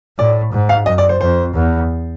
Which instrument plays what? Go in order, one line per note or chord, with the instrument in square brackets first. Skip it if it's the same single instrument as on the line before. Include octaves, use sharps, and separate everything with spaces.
[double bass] A2 [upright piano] D5
[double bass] G#2
[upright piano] F5
[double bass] F#2 [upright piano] D#5
[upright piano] D5
C5
[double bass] F2 [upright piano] C5
[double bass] E2